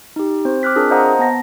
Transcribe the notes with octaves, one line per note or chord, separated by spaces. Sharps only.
D#4 G4
C4 C5
D6 F6 F#6 B6
C4 D4 F4 G#4 A#4
C5 D#5 F5 F#5 A#5 D#6
B3 A5 A#6